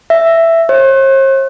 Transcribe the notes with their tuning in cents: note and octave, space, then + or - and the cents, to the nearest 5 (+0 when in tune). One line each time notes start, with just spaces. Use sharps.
E5 +5
C5 +45